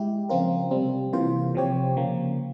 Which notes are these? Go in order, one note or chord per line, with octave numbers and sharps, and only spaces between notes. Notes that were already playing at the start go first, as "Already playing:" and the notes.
Already playing: G#3 E4 G4
C#3 F3 C4 F4 A#4
C3 G3 C4
C3 E3 A#3 F4 C5
C3 F3 C4 G4 C#5
C#3 F3 A#3